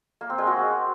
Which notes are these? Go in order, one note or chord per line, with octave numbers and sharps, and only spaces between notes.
A#3
C4
G#3
F#4